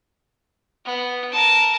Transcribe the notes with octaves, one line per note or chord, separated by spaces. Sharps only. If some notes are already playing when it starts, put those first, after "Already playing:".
B3
A#4 A5